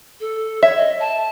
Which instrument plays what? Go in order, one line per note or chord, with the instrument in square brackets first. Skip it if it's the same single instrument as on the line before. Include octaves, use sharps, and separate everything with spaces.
[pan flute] A4
[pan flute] C#5 [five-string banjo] E5
[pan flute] D#5
A5